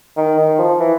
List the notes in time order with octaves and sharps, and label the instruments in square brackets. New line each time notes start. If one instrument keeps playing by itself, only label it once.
[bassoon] D#3
D#3
F3
E3